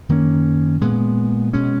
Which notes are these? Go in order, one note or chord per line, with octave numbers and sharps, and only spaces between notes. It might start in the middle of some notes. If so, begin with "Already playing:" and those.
F#2 D#3 A#3 C#4
A#2 G#3 B3
B2 G#3 C#4